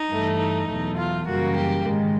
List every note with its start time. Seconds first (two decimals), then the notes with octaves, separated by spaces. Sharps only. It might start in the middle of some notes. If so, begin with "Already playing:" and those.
Already playing: D#4
0.09 G2 E3 A3
0.38 D#4
0.68 E2 B2 F#3 A3
0.97 F4
1.26 F#2 C#3 E3 G3 A#3 F#4
1.56 G4
1.85 G#2 D#3 G#3